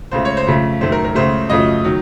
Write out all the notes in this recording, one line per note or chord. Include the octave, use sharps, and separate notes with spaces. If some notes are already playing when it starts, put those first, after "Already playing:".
C#2 C#3 A3 C5
C#5
C5
F2 C#3 A3
F#2 D#3 A3 C5
A#4
A#4
C#2 C#3 A3 C5
F#2 C#3 F3 A3 D#5
D#3 F#3